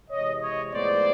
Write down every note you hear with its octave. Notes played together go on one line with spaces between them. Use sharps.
C3 E3 G#3 C#5 D#5
C#5 D#5
A2 F3 G#3 B3 C5 D5